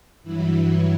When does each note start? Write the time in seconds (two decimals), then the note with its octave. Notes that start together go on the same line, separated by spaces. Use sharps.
0.23 G2 E3 F#3 E4
0.52 E3 E4